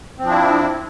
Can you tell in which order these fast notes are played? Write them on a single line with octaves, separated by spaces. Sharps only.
C4 F3 D4 E4